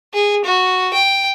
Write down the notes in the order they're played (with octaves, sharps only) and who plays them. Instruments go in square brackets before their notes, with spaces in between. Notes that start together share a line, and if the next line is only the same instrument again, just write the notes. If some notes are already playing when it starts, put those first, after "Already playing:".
[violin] G#4
F#4
G5